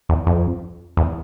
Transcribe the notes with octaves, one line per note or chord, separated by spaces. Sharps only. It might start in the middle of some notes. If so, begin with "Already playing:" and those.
E2
F2
E2